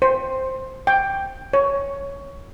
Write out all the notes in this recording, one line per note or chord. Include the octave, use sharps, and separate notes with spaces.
C5
G5
C#5